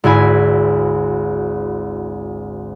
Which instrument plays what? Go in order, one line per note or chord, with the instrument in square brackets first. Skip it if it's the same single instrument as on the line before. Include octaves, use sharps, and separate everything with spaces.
[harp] G#1 D2 E4 G#5 B5